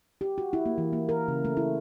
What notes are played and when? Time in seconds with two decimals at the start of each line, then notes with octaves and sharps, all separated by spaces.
0.21 G4
0.38 F#4
0.53 E4
0.66 A#3
0.78 E3
0.93 A#3
1.09 A#4
1.28 C#3
1.45 A3
1.57 E4